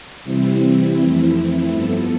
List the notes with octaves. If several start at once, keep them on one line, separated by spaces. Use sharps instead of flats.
C3 E3 G3 C4 E4
F2 E3 A3 C4
G2 F3 B3 A4